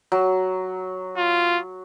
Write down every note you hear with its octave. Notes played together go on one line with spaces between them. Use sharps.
F#3
F4